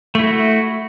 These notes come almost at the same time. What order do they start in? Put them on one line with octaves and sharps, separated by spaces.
A3 E4 F#4